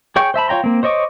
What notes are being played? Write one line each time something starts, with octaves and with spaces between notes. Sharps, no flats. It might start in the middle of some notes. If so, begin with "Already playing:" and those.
G#4 C#5 G5 C#6
C5 E5 A5 B5
F4 C#5 G5 A#5 C6
A#3 C4
C5 C#5 D#5 C#6 D6